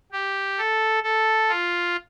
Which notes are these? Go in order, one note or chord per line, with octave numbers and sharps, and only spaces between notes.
G4
A4
A4
F4